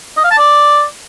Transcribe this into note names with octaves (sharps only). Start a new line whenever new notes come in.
D#5
F5
A5
D5